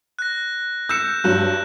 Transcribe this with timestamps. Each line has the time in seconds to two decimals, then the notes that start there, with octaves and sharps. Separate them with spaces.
0.19 F#6 A#6
0.89 E6 G6 C#7 E7
1.24 G2 F#3 F#6 E7